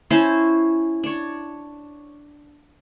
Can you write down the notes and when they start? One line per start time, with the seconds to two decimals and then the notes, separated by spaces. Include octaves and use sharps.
0.10 C#4 E4 C5 A5
1.04 D4 C#5